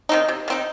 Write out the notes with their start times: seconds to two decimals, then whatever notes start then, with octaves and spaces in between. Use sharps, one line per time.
0.09 D#3 C4 D#4
0.28 C3
0.48 D#3 C4 D#4